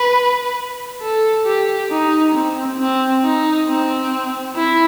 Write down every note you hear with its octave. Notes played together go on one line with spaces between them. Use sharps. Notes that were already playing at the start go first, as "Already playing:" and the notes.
Already playing: B4
A4
G4
D#4
C4
C4
D#4
C4
E4